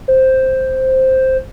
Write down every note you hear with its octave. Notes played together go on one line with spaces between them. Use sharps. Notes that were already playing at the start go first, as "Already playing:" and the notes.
C5